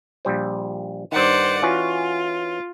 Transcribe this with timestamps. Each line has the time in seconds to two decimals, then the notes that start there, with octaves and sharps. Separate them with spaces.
0.25 A#1 G3 C5
1.12 G2 D#3 C5 D5 F#5
1.62 E3 C#4 F4 F#4